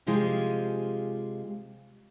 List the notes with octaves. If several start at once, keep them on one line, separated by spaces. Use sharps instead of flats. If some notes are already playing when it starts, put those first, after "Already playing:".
C3 F3 G#3 F4 G4 G#4